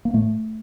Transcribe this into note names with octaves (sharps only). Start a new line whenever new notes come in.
A#3
A2 A3